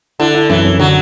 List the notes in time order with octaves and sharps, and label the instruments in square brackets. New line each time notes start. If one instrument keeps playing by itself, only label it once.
[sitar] D3 [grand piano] E4
[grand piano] E4
[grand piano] F#2 [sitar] E3
[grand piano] F#2
[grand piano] D3 [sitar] F#3